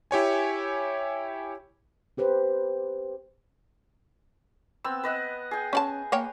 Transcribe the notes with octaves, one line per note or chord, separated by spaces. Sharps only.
E4 G4 C#5 G#5
C4 G4 B4 C5
B3 C4 E6
B4 D#5 F#5
G#4 G5
C#4 D5 A5
A#3 C#5 G5